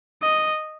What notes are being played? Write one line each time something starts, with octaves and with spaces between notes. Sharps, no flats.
D#5